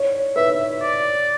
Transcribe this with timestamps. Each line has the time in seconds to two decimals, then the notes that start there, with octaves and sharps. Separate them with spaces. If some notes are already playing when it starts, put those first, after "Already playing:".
Already playing: C#5
0.36 B4 E5
0.82 D5